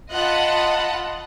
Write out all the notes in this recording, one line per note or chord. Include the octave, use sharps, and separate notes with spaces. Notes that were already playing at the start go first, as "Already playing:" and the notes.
F4 D#5 F#5 A5 B5